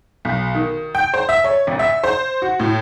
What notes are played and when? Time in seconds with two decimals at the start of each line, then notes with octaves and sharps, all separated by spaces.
0.25 B1
0.55 D#3
0.95 G5
1.14 C5
1.29 E5
1.44 C#5
1.67 G#1
1.79 E5
2.04 C5
2.42 F#4
2.60 A2